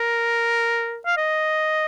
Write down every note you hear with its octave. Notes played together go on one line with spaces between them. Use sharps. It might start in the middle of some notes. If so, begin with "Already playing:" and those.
Already playing: A#4
F5
D#5